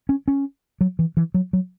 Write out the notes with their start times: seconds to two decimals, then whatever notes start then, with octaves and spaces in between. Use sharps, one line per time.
0.09 C#4
0.28 C#4
0.81 F#3
0.99 E3
1.17 E3
1.34 F#3
1.53 F#3